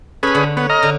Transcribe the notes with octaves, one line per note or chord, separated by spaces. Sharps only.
C#4 G#4 A4 B4 B5
D3
B3 C#5
D#5 A#5 F6
D3